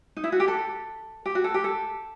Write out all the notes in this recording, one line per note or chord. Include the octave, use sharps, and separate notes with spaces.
D#4
E4
F#4
G4
A4
G4
F#4
A4
G4
A4